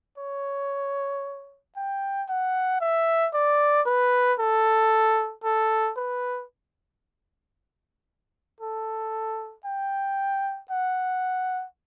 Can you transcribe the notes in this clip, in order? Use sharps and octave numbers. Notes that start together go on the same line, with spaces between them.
C#5
G5
F#5
E5
D5
B4
A4
A4
B4
A4
G5
F#5